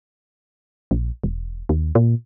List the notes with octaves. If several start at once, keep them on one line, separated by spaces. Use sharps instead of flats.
A#1
E1
D#2
A#2